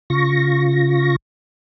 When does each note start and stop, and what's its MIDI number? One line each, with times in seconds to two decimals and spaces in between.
0.10 1.16 49
0.10 1.16 65
0.10 1.16 85
0.10 1.16 94